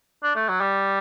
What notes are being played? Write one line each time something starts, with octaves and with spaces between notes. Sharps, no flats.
D4
A3
F#3
G3